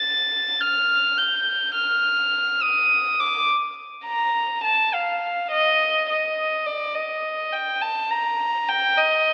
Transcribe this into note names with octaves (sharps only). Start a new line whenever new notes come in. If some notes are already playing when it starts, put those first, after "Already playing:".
Already playing: A6
F6
G6
F6
D#6
D6
A#5
A5
F5
D#5
D#5
D5
D#5
G5
A5
A#5
G5
D#5